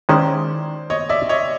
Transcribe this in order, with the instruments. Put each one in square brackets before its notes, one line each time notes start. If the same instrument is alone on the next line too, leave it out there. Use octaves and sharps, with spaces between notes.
[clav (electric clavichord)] D#3 G#3 C#4 E4 [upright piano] C5 D5
[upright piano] C#5 D#5
D5 E5
C#5 D#5